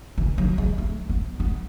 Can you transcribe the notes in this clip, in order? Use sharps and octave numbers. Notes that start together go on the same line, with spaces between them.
E3
F#3
G#3
A3
B3
B3